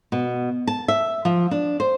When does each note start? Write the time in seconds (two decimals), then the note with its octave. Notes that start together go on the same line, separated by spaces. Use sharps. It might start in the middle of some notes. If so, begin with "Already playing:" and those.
0.12 B2
0.67 A5
0.88 E5
1.25 F3
1.51 D4
1.80 C5